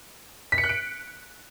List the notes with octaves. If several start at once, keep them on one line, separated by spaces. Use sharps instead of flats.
B6
C#7
F#6
D7